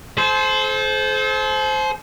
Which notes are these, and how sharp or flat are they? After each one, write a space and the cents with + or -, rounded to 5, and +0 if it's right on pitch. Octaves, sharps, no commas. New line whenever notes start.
A4 -45 C5 +0